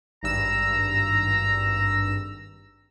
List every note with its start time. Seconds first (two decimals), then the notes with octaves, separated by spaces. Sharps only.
0.23 G#1 G2 A#5 E6